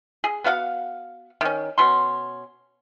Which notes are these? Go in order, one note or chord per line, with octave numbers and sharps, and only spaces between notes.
G#4
B3 F#4 F5 F#5
D#3 C#4
B2 C#4 C6